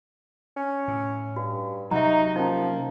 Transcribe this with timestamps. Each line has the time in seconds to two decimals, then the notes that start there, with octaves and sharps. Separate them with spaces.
0.56 C#4
0.88 A2
1.36 G2 F#4
1.91 C3 F#3 D#4 F#4 E5 A#5
2.36 F3 A#3 C#4 D#4